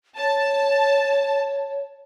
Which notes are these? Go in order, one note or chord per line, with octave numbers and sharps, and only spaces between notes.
C#5 A5